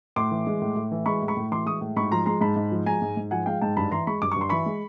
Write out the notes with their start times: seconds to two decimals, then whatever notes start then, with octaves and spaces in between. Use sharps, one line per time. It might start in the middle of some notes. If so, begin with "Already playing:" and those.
0.16 A2 C6 D6
0.31 E3
0.47 G#3
0.61 A2
0.76 A2
0.92 E3
1.06 G#3 B5 C#6
1.22 A2
1.28 B5 C#6
1.37 A2
1.52 E3 C6 D6
1.66 G#3 C#6 D#6
1.81 A2
1.97 G#2 B5 C#6
2.11 F3 A#5 C6
2.26 G#3 A#5 C6
2.41 G#2 A5 B5
2.56 G#2
2.72 F3
2.86 G#3 G#5 A#5
3.02 G#2
3.17 G#2
3.31 F3 F#5 G#5
3.46 G#3 F5 G5
3.61 G#2 G5 A5
3.77 G2 A5 B5
3.92 E3 A#5 C6
4.07 G#3 B5 C#6
4.22 G2 D6
4.32 C#6
4.36 G2 C6
4.49 E3 B5 C#6
4.66 G#3